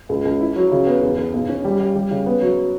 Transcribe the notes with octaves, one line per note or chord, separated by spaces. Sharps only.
C#2
C#2
E4
F#3
C#3
B3
E2
E2
B1
C#4
G3
G3
G3
C#3
B3
F#3